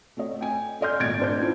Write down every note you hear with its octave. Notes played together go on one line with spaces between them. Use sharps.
A3 C4 C#5 D#5
G5 G#5
A4 D5 D#5 C6 F6 G6
G#1 A#2 A3 G#6 A6 D7
D4 C5 G6
C4 C#4 E4 F4